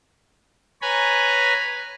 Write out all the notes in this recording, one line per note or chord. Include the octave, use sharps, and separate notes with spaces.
B4 C#5 G#5 A#5 B5